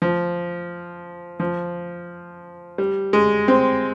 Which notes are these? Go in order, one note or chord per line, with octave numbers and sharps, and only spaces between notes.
F3
F3
G3
G#3
C4